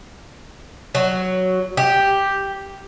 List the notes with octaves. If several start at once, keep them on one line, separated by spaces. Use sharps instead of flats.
F#3
G4